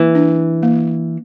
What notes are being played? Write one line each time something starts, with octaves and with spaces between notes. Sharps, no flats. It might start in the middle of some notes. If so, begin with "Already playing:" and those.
Already playing: E3 A#3
D4
A#3